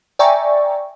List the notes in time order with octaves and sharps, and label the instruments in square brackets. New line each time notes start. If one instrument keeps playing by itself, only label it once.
[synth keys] D5 E5 G5 G#5 A#5 C#6